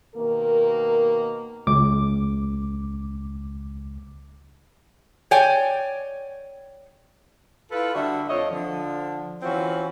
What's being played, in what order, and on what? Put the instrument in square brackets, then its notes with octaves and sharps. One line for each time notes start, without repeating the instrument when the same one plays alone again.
[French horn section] B2 D#3 A#3 A#4
[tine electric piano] C#2 D6
[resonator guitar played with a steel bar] C#5 D5 G5 G#5
[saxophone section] E4 F4 A4 B4 F5
D3 G3 F#4 E5
F2 A3 F4 C#5 D#5
D3 F3
E3 C4 C#4 F4 F#4